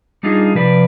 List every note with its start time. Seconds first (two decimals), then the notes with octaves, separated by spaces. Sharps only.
0.23 G3 D4 D#4 F4 G#4
0.55 C3 F3 B4 D5